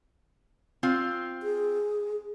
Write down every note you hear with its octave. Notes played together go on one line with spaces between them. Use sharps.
C4 F4
G#4